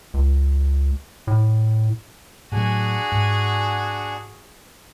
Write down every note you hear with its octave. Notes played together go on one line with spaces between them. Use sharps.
C#2
A2
A2 F#3 D4 F#4 G#4 F#5 G#5
G#2